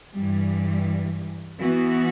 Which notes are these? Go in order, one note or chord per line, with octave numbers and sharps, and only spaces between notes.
G2 E3 G3
E3 B3 F#4